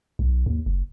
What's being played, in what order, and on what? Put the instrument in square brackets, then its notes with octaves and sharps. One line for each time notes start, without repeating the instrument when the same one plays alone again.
[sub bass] B1
D#2
F#1